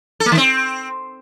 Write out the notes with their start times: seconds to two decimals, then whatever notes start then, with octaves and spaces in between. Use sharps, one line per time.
0.20 A4
0.26 A#3
0.32 D#3
0.37 C4